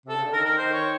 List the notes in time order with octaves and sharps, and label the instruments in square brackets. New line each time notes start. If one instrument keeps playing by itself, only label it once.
[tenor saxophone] C3 [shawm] A4
[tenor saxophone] C#3
D3
[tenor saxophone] D#3 [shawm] A#4
[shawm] A#4
[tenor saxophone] D#3 [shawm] C5
[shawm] C#5